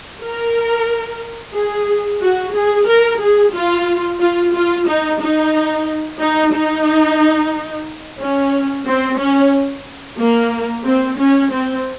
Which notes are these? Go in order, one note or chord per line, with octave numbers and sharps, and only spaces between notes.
A#4
G#4
F#4
G#4
A#4
G#4
F4
F4
F4
D#4
D#4
D#4
D#4
C#4
C4
C#4
A#3
C4
C#4
C4